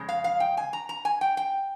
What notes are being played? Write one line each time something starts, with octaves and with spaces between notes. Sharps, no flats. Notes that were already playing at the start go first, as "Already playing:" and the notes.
Already playing: F2 C#3 G#3
F5
F5
G5
G#5
A#5
A#5
G#5
G5
G5